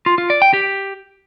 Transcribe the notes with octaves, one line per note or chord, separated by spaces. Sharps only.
F4
F4
D5
G5
G4